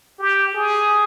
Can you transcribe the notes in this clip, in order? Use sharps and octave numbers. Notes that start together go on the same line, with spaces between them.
G4
G#4